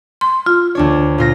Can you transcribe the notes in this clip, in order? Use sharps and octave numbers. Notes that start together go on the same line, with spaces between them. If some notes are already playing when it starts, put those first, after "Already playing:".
C6
F4
D2 D4 C#5
A#2 F4 A#6